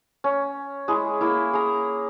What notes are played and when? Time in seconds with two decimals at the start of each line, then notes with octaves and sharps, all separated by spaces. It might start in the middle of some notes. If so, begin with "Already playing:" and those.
0.24 C#4
0.88 G#3 E4 G#4
1.21 A#3 E4
1.53 G#4 A#5